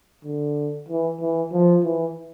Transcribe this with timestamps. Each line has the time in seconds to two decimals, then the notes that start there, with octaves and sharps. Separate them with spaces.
0.25 D3
0.88 E3
1.20 E3
1.53 F3
1.84 E3